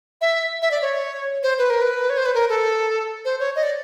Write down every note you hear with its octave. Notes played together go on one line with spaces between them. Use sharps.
E5
E5
D5
C#5
C5
B4
A#4
B4
C#5
C5
B4
A#4
A4
C5
C#5
D#5
D5